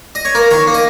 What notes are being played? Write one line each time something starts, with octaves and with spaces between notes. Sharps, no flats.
D#5
C#5
A#3 A#4
D#3 C#5
A#3
D#5